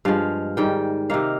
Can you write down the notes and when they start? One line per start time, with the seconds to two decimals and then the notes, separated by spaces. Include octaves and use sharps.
0.05 G2 F3 G#3 F5
0.57 G#2 D#3 G3 G5
1.10 C3 D#3 A#3 F5